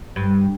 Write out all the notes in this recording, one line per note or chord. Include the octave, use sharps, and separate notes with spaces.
G2